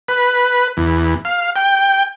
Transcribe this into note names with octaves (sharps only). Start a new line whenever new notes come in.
B4
E2
F5
G5